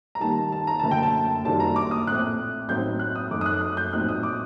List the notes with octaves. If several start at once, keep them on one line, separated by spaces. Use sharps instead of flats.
A#5
D#2 D#3 G3 A5
A5
A#5
F#1 F#2 D3 A3 A5
G5
A5
F#1 F#2 D#3 G3 D4 A5
A#5
D6
D#6
A#1 A2 A3 C4 F#6
A1 A2 F#3 C4 D#4 G6
F#6
D#6
F#2 F#3 A3 D#4 D6
D#6
F#6
F#6
G6
A#1 A2 F#3 C4 D#4 F#6
D#6
D6